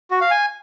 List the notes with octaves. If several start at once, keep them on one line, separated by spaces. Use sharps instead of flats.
F#4
F5
G#5